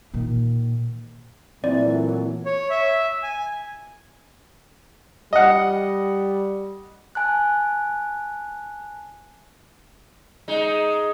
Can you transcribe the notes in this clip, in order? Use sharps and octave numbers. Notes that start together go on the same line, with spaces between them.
A#2 D#3
A#2 E3 F#3 A3 C4 D5
C#5
E5
G#5
G3 D#5 F#5
G#5 A5 F#6
G#3 D#4